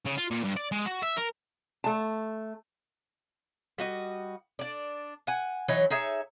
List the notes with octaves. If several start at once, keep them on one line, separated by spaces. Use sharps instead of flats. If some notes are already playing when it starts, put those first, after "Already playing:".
C#3
F4
A#2
G2
D5
G#3
F#4
E5
A#4
A3 A5
G3 F#4 D#5
D4 D5
F#5 G#5
E3 F#3 D#4 C#5
D#4 G#4 C#5 E5